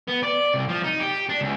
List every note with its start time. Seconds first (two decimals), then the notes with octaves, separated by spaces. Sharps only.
0.08 B3
0.23 D5
0.55 C2
0.69 F3
0.84 D#4
1.00 G4
1.29 D4
1.41 C#2